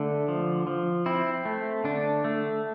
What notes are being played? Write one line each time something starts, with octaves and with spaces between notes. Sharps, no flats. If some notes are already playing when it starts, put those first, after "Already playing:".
Already playing: D3 A3
F3
F3
C4 E4
A3
D3 D4
A3